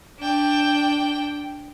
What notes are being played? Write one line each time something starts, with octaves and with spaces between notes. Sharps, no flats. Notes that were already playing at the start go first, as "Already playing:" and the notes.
D4 G5